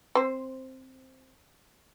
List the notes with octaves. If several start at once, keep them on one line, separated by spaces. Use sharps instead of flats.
C4 C5